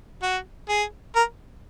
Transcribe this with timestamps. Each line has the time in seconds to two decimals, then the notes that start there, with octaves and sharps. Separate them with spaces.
0.23 F#4
0.69 G#4
1.16 A#4